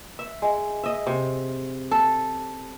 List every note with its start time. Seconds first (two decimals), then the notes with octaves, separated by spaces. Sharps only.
0.19 E5
0.42 G#3
0.83 D#5 E5
1.07 C3
1.91 A4